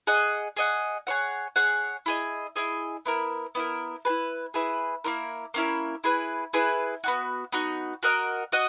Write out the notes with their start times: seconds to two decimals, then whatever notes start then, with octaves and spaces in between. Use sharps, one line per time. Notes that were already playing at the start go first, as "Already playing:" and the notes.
0.07 G#4 D#5 F#5
0.57 G#4 D#5 F#5
1.07 G#4 C#5 F#5
1.56 G#4 C#5 F#5
2.06 E4 G#4 D#5
2.56 E4 G#4 D#5
3.06 B3 E4 A#4
3.55 B3 E4 A#4
4.05 G#4 B4
4.09 E4
4.54 E4 G#4 B4
5.04 A#3 C#4 E4 A#4
5.54 A#3 C#4 E4 A#4
6.04 E4 G#4 B4
6.54 E4 G#4 B4
7.04 B3 D#4 F#4
7.52 B3 D#4 F#4
8.03 F#4 A#4 D#5 F#5
8.52 F#4 D#5 F#5